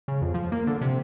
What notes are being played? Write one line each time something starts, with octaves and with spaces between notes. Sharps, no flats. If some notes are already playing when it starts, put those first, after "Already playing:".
C#3
F2
F3
A#3
D3
C3